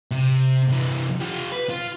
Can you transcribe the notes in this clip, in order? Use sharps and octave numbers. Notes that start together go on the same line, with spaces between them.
C3
C3 E3
F4 G4
B4
F4